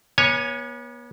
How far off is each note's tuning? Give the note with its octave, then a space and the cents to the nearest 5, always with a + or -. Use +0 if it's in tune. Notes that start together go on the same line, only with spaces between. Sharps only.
B3 -40 C#5 +0 G#5 +0